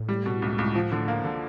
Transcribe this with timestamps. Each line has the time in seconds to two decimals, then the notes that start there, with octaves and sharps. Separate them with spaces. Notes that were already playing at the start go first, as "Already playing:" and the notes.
Already playing: A2
0.09 G3
0.26 B2
0.42 C#2
0.58 C#2
0.75 F3
0.92 D3
1.08 A#3
1.24 D3